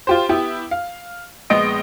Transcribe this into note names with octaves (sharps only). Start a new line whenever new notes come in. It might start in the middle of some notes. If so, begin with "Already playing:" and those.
F4 G4 C5
B3 E4 G4
F5
A#1 G#3 B3 D#5 D7